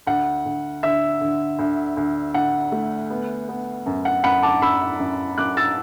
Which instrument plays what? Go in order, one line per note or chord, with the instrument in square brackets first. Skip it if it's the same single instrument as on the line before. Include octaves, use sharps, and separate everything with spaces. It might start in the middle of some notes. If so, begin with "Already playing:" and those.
[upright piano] D2 F#5
D2
D3 E5
D3
D2
D2
D2 F#5
A3
B3
B3
F#2
F#5
F#2 F#5 B5
A5 D6
F#2 B5 E6
F#2
F#2 D6 F#6
E6 A6